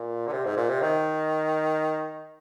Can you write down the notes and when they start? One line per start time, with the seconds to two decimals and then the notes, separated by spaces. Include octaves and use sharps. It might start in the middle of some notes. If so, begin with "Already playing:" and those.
Already playing: A#2
0.27 D3
0.32 C3
0.45 G#2
0.56 A#2
0.69 C3
0.82 D#3